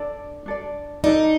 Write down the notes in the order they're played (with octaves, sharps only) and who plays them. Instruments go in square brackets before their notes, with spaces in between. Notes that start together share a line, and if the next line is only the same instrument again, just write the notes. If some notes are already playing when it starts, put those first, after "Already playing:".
Already playing: [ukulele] D4 A4 D5
D4 A4 D5
[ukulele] D4 A4 D5 [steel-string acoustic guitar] D#4